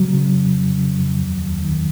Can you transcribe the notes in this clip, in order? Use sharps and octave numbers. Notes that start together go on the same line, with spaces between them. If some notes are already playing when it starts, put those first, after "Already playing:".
Already playing: C#3 F#3
C#3
F2
F2
C#3
F2
D#2
D#2
D#3